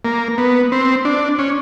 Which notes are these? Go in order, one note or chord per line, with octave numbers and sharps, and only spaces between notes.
A#3
B3
C4
D4
C#4